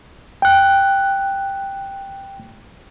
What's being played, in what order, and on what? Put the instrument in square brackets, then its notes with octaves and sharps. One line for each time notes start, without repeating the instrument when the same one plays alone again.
[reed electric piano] G5 F#6